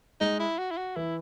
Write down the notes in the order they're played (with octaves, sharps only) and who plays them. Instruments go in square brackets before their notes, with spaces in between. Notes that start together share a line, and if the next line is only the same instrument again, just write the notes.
[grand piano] G#3 [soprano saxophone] D#4
[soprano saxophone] E4
F#4
E4
F#4
[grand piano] E3 [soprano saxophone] E4